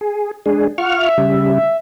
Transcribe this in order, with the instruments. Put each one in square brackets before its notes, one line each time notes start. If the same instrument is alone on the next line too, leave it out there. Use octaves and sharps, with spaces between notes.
[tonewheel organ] G#4
G#3 D4 G#4
[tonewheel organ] F4 C#6 F6 [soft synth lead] F#5
[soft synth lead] E5
[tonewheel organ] C#3 G3